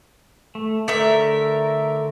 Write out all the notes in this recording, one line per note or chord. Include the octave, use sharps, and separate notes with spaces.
A3
D3 A3 A#4 E5